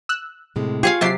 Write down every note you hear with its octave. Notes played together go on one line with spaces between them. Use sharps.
E6 F#6
A2 C3 G#3
F4 G4 G#4 C#5 F5
C3 F#3 G4 A6 C7